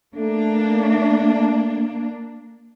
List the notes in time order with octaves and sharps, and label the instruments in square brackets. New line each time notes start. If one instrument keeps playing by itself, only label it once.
[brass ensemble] A3 [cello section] A#3 D4